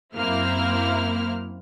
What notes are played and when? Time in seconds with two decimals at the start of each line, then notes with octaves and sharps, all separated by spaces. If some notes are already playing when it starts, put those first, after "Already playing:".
0.15 F#2 A#3 C4 E4 F6